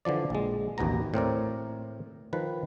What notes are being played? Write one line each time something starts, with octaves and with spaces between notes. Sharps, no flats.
D3 E3 F3 D5
A#1 G#3
A1 D#2 B2 B3 A#5
A2 C4 A#4 D5
D#3 F3 B4